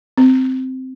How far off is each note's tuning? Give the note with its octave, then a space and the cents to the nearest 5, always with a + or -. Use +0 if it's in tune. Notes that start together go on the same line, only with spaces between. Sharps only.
C4 -10